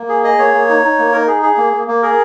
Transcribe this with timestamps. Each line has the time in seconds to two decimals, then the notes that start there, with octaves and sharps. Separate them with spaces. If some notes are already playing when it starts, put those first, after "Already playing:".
Already playing: A#3
0.09 G#4
0.24 G#4 D#5
0.38 A#3 C#5
0.54 A#3
0.69 D#4
0.84 D#4
0.99 A#3
1.13 D#4 A#4
1.28 G#4
1.42 G#4
1.58 A#3
1.73 A#3
1.88 A#3
2.02 G#4 A#4